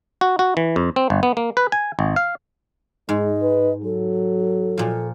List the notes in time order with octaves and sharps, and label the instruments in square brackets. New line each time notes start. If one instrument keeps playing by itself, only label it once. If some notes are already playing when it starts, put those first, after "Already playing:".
[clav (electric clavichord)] F#4
F#4
E3
F2
C4
G1
B3
A#3
B4
G#5
G#1
F5
[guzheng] G#2 [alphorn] G#3 [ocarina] D#5
[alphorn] B4
[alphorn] F#3 [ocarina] A4
[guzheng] A#2 F3